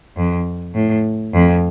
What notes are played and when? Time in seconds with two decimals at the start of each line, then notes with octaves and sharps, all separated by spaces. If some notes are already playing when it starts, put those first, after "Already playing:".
0.17 F2
0.74 A2
1.34 F2